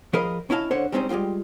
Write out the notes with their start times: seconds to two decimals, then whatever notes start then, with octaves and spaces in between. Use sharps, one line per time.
0.13 F3 G#4 A#4 D#5 F5 B5
0.50 C#4 E4 D#5 F5 A5
0.71 D3 C#4 C5 C#5 F#5
0.92 G3 G#3 C4 C#4 D#4 C5
1.09 G3 G#3 C4 F4 G4